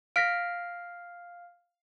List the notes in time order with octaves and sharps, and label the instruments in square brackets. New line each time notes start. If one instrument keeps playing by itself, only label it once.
[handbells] F5 F6 [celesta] A#6 B6 D7